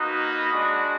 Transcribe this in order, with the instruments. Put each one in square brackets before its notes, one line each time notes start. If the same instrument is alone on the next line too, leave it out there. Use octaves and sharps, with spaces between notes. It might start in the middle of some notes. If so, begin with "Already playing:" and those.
Already playing: [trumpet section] A#3 D#4 F#4 B4 D#5
G#3 D4 F#4